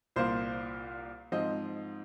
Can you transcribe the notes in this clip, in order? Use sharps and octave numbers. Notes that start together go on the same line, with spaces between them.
C2 A#2 A#3 C5
G#2 F3 C4 D#5